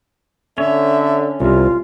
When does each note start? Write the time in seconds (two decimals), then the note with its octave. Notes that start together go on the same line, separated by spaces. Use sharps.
0.58 D3 C#4 C#5 E5
1.40 C2 C3 F4